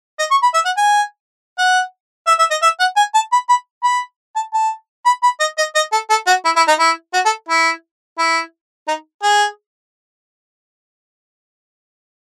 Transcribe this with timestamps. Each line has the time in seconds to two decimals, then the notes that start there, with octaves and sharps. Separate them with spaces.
0.19 D#5
0.31 C#6
0.42 B5
0.54 E5
0.65 F#5
0.77 G#5
1.58 F#5
2.27 E5
2.39 E5
2.51 D#5
2.62 E5
2.79 F#5
2.96 G#5
3.14 A5
3.32 B5
3.49 B5
3.83 B5
4.36 A5
4.53 A5
5.05 B5
5.23 B5
5.40 D#5
5.58 D#5
5.75 D#5
5.92 A4
6.10 A4
6.27 F#4
6.45 E4
6.56 E4
6.68 D#4
6.79 E4
7.13 F#4
7.25 A4
7.49 E4
8.18 E4
8.88 D#4
9.23 G#4